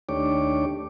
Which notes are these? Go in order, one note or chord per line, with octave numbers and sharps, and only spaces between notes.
D#2 A3 D4 G4 C#5 D6